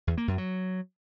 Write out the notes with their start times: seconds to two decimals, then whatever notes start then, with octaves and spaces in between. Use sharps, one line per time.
0.07 E2
0.17 A#3
0.28 F#2
0.38 F#3